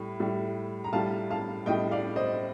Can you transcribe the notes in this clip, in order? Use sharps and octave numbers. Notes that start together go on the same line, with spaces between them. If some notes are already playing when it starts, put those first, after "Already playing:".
Already playing: A2 G3
A2 G3
A#5
A2 G3 F5 A5
F5 A5
A2 G3 D#5 G5
D5 F5
C5 D#5